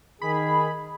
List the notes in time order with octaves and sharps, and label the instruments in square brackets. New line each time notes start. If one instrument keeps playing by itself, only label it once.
[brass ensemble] D#3 G#4 [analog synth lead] B5